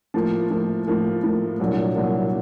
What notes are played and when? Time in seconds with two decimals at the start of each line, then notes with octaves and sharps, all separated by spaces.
0.14 A2 F3 A#3
0.50 A2 F3 A#3
0.87 A2 F3 A#3
1.23 A2 F3 A#3
1.60 C2 A#2 F#3 A#3 D4
1.96 C2 A#2 F#3 A#3 D4